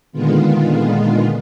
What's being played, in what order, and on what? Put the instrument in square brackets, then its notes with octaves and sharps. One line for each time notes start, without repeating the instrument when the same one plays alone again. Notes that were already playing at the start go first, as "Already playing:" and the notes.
[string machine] A#2 D3 D#3 G#3 B3 F4